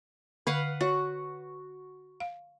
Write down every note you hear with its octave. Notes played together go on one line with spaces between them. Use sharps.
D3 B4 F5 F#5 C#6
F#4 C#5
F5